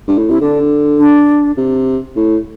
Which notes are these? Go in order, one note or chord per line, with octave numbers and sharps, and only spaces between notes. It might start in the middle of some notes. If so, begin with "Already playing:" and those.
G2
A2
C3 E4
D3 D4
D4
C3
A2